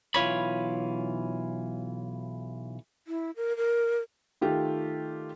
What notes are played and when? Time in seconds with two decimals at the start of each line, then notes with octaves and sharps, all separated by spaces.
0.15 B1 E3 F4 C#5 B5
3.07 E4
3.36 A#4
3.57 A#4
4.41 D#3 A3 F4 G4